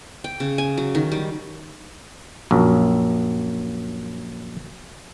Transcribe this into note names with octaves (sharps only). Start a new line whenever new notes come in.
G5
C#3
G#5
F#3
D#3
G3
A#1 F#2